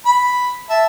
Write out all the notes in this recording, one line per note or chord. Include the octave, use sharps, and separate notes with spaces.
B5
E5 A5